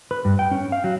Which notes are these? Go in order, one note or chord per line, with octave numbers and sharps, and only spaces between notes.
B4
G2
G5
C#4
F5
F#3